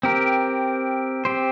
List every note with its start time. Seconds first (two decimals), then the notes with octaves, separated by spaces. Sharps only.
0.03 C4 G4 A#4
1.25 C4 G4 C5